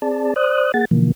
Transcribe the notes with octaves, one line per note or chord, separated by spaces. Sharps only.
C4 G#4 D5 A5
C5 D5 D#6 F#6
A#3 G#4 F#5 A6
B2 D3 E3 F3 A#3